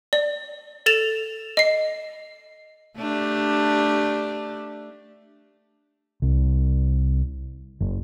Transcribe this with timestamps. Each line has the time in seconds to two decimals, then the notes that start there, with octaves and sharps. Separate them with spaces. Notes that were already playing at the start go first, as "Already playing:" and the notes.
0.13 D5
0.86 A4 A6 E7 F7
1.57 D#5 C7
2.98 A3 D4 G4
6.22 C2
7.81 F#1